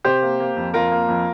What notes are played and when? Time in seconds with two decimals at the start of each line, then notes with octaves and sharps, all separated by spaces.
0.05 C3 G4 C5
0.22 A#3
0.40 A#3
0.57 F2
0.74 F2 F4 A#4
0.92 A#3
1.09 F2